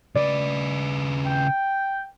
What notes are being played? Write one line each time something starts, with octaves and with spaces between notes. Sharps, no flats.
C#3 B4 D5
G5